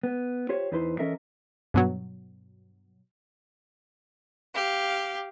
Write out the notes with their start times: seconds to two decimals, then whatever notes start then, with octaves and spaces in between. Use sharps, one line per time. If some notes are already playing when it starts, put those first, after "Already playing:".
0.03 B3
0.49 F4 G4 C5 C#5
0.72 E2 D#4 E4 B4 C5 C6
0.99 E3 C#4 A4 A#4 D#5 E5
1.74 G2 B2 F#3
4.54 G4 F5